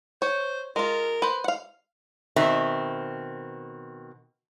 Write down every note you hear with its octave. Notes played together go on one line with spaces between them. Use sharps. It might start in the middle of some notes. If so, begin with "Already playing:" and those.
C5 C#5
G#3 F4 A#4
B4 C5
F5 F#5
B2 D#3 C4 E5